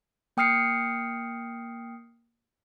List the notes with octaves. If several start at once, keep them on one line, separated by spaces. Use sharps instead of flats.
A#3 G5 D#6 F6 C7 C#7